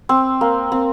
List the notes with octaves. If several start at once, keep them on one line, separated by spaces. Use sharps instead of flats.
C4
A#3
C4